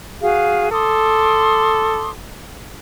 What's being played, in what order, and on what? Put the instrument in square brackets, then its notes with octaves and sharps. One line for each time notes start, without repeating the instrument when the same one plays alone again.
[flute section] F#4 G#4 F5
[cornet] A4 [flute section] C6 D6 D#6